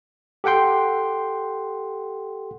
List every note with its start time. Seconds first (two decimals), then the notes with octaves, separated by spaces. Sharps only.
0.44 G4 A4 F#5 G5 C6